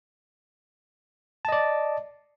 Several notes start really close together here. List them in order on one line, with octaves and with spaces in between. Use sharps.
A5 D#5 D5